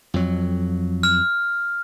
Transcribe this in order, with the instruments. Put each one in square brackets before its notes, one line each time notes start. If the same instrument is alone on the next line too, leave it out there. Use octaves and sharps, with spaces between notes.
[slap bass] F2 F#3
[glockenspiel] F6